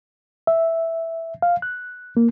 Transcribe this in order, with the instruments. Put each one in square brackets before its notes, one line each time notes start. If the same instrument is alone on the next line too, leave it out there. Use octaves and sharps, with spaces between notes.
[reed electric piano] E5
F5
F#6
A#3